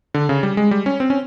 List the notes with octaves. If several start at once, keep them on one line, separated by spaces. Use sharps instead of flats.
D3
C#3
G3
G#3
G3
C#4
C4
C#4